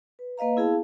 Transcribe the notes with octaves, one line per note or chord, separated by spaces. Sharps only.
B4
A#3 B4 D#5 F5 A#5
B3 E4 G#4 F5 A5